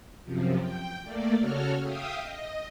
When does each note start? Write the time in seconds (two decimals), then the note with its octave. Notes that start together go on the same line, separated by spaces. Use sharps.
0.25 F#2 C3 F3
0.60 G5
1.04 A3 A#3 D5
1.38 C#3 F#4 A4 C#5 F6
1.83 E5 F5 G5 D#6
2.18 D#5